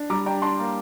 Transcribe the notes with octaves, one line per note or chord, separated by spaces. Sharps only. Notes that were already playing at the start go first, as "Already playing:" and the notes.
Already playing: D4
G3 A#5 D6
D4 G5 A#5
D4 A5 C6
A#3